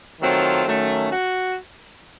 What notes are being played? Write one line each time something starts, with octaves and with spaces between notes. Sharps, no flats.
D#3 F#3 A3 C4 F4
D#3 F#3 A3 C#4
F#4